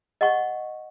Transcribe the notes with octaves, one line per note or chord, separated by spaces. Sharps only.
D#5 F#5 C#6